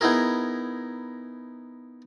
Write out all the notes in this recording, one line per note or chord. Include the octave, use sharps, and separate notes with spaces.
B3 D#4 E4 G#4 A#4